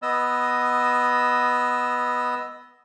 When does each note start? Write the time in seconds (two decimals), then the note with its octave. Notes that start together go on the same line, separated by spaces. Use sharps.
0.02 B3 D#5 E6